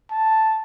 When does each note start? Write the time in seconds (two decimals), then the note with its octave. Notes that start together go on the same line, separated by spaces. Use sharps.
0.11 A5